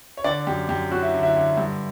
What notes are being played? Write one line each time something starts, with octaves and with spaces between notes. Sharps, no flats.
C#5
D3 D5
F#2 G4
F#2 G4
F#3 F#4
E4
D3
E4
D3
G2